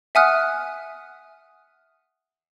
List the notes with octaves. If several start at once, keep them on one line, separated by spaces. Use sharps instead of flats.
E5 F#5 G#5 D#6 F6 F#6